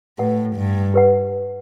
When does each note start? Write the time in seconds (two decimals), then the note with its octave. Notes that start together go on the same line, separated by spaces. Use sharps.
0.18 A2 G4 B4 F#5
0.56 G2
0.94 G4 B4 F#5